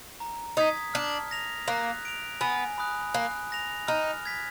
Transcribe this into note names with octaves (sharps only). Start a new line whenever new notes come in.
A#5
D#4 D#6 G#6 B6
D4 F6
A#6 F7
A#3 F#6
D7 F7
B3 G#5
B5 D#6 F#6
A#3 F#6
A#6 F7
D#4 F6
G#6 B6